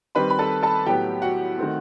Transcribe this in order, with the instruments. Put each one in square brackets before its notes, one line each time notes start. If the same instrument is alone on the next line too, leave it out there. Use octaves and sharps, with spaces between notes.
[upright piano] D#3 G3 C4 B4 B5
B5
A4 A5
A4 A5
A2 F#3 B3 G4 G5
F#4 F#5
D#3 A3 C4